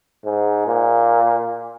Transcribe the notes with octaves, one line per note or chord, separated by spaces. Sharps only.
G#2
A#2